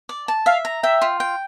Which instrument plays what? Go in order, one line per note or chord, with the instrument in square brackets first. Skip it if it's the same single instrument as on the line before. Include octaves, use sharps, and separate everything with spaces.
[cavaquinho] D5
A5
[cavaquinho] E5 [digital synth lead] F5
[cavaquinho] A#5
[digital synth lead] E5 [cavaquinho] G5
[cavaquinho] F4
G5